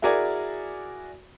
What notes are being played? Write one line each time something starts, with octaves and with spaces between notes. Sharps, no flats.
E4 F#4 G#4 A#4 D5 G#5